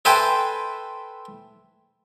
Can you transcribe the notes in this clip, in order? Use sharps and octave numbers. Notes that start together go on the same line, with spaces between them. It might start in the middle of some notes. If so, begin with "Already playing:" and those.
A4 B4 C5 E5 G5 G#5